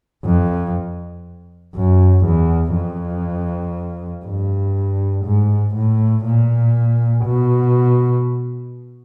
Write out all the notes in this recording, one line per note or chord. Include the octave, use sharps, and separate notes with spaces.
F2
F#2
E2
F2
G2
G#2
A2
A#2
B2